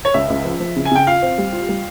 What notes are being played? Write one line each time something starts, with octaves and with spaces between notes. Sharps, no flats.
C#5
C#2 E5
C#2
F3
F3
C#3
G#5
C#3 G5
F4 F5
C4
G3
F4
G3